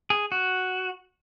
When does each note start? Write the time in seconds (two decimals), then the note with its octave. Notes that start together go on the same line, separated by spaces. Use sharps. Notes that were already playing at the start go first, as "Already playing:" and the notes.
0.10 G#4
0.32 F#4